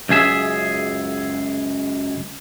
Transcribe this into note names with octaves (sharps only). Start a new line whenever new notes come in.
C#2 F#2 G#4 E5